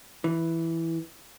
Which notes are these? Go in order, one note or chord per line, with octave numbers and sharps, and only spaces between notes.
E3